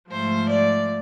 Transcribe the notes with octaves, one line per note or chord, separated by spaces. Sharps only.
G#2 F3 A3 C5
D5